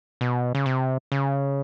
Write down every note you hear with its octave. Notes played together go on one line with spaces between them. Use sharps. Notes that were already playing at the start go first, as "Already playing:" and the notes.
B2
C#3
C3
C#3